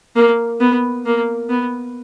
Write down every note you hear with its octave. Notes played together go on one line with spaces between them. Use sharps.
A#3
B3
A#3
B3